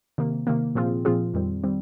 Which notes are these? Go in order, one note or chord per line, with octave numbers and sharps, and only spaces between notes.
C3 D#3 A#3
C3 D#3 A#3
A#2 F3 C4 F4 G#4
A#2 F3 C4 F4 G#4
F2 D#3 G3 C4
D#3 G3 C4